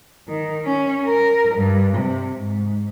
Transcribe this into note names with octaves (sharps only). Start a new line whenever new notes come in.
D#3
C#4
A#4
G2
C3
G#2